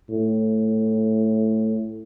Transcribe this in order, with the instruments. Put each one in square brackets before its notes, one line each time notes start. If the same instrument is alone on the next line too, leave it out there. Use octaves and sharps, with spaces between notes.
[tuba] A2